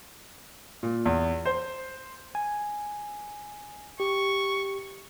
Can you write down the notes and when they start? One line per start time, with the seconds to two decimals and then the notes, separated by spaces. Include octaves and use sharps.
0.83 A#2
1.06 E2
1.46 C5
2.35 G#5
4.00 G4 C#6